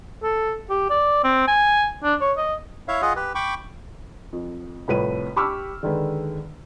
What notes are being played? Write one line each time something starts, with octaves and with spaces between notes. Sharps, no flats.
A4
G4
D5
C4
G#5
D4
C#5
D#5
E4 C#5 E5 F5
F4 G#4 D#5 F#5
G4 B4
G5 B5 C#6 D6
F2
C2 F2 A2 B4 C#5 D#7
G4 B5 C#6 D6 E6 F6
D3 D#3 G#3 B4